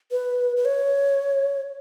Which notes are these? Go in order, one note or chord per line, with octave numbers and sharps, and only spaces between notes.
B4
B4
C#5